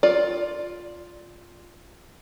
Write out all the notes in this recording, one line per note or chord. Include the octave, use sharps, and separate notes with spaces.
F4 D5